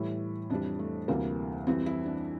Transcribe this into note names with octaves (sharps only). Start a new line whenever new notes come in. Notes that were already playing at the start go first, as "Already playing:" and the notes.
Already playing: A2 E3 G3 E4
F2 E3 G3 D4
A3
D2 C3 E3 G3 A#3
F2 E3 G3 C4
E4
D4